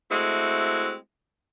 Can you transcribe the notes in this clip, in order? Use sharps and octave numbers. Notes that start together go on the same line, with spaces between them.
G#3 A3 C4 E4 F#4